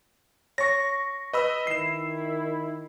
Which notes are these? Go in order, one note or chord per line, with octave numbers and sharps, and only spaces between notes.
C#5 C#6 A#6
B4 D#5 B5 E6
D#3 E4 C7 E7